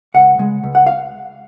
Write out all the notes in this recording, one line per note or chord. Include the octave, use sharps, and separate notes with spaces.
C#2 F#5
C#3 G#3
C#2
F#5
F5